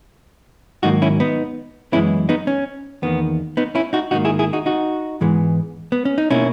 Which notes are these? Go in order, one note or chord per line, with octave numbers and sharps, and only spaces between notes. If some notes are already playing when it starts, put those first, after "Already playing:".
G#2 D#3 F#3 A#3 D#4 F#4
C#4 E4
B3 D#4
F#2 E3 G#3 B3 C#4 E4
B3 D#4
C#4
E2 D#3 A#3 B3
B3 D#4
C#4 E4
D#4 F#4
G#2 D#3 A#3 D#4 F#4
E4 G#4
E4 G#4
D#4 F#4
D#4 F#4
G#2 E3 G#3 B3
B3
C#4
D#4
B2 A#3 C#4 E4